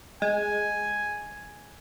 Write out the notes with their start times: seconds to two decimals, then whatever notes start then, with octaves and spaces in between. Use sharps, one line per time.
0.22 G#3 G#5